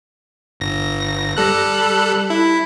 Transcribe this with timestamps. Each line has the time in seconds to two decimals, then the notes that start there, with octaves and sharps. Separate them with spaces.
0.60 G1 A#6
1.37 G3 A4 F#6
2.30 E4